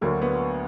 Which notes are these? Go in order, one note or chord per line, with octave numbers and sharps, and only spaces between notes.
D2 D3 F#3 A#3 D4 F#4
B3